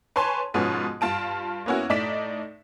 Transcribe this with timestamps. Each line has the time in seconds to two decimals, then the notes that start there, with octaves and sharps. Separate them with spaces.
0.16 B4 C#5 G#5 A5 C6
0.54 G#2 B2 F3 B3 C#4
1.01 G2 F4 A5 D7
1.66 A#3 B3 C#4 E4 F#4
1.89 A2 D#4 D5 B6 E7